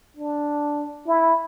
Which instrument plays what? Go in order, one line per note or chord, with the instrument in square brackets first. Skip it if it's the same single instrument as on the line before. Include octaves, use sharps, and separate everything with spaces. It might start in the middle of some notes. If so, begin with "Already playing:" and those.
[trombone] D4
E4